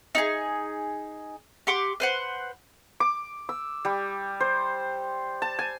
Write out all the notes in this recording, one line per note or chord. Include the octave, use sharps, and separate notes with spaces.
D#4 F#4 G#4
G4 F#5 C6 D6
B4 C5 F#5
D6
E6
G3
C5
A5
G#5